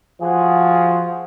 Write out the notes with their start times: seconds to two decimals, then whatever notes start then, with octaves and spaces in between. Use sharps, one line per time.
0.22 F3 F#4 G#4